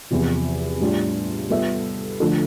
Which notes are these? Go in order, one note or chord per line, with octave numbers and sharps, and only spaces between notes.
E2 C3 F3
A2 G3 D4 F4
G3 B3 F4 A4 E5
D3 F3 A3 D4 A4